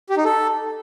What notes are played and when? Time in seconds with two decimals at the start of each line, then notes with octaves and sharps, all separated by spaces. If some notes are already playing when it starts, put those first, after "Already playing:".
0.10 G4
0.17 D#4
0.25 A4